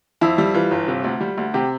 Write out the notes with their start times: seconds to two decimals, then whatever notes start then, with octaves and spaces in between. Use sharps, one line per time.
0.21 F2 E4
0.38 G3
0.54 E3 F4
0.71 G1
0.88 C3
1.04 D2
1.21 G3
1.38 D2
1.54 C3 G4